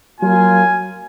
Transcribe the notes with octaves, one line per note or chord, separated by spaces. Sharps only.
F#3 A#3 F4 G#5